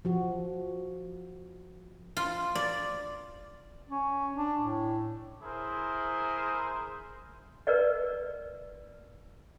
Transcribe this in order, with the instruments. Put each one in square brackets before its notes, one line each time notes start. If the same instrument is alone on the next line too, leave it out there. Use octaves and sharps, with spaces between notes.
[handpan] F3 F#4
[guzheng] F4
D5
[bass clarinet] C#4
D4
A2
[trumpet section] E4 G#4 A#4 C5
[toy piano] A#4 B4 D5 D#5